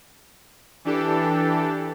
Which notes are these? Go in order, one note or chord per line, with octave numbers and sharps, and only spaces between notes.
E3 D4 G4 A4